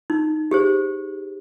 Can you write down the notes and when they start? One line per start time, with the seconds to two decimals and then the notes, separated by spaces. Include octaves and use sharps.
0.10 D#4
0.51 G4 G#4 C5